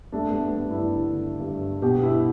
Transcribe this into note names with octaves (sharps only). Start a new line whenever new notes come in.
A3 D4
B3
A3
G2 B3
E4
D4
D3
G2
B2 G4
E4